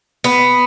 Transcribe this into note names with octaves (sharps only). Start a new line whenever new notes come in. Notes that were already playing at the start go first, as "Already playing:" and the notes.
B3